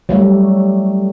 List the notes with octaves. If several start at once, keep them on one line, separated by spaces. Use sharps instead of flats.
F#3 G3 A3